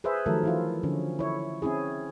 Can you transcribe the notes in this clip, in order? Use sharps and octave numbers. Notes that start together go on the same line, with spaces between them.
G#4 B4 C5 E5
D#3 F3 F#3 A3 A4 A#4
E3 E4 F4
D3 F3 C#4
E4 C#5
C4 C#4 E4 G#4